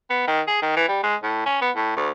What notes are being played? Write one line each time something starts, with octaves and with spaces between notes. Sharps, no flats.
B3
D#3
G#4
D#3
E3
G3
G#3
A2
C#4
B3
A2
D2